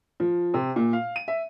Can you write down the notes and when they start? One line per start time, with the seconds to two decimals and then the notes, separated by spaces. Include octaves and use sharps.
0.20 F3
0.54 C3
0.76 A#2
0.93 F5
1.16 D#7
1.28 E5